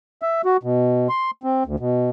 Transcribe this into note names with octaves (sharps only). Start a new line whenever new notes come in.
E5
F#4
B2
C6
C4
D2
B2